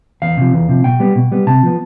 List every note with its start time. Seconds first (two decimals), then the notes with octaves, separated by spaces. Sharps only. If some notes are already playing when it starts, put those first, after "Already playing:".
0.22 E2 F5
0.37 C3 F3
0.53 E2
0.69 C3 F3
0.84 B2 G5
1.00 G3 B3
1.16 B2
1.32 G3 B3
1.47 C3 A5
1.63 F3 B3